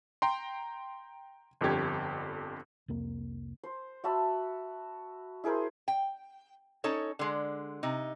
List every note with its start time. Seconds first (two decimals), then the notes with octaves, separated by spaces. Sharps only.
0.22 G5 A#5 C6
1.61 G1 F2 D3 G4 G#6
2.88 C2 F2 A#3
3.64 C5
4.04 F#4 E5 A5 B5
5.44 E4 G#4 A#4 C5
5.88 G5
6.84 C#4 D#4 A4 C#5
7.19 D3 G#3
7.83 C3 D#4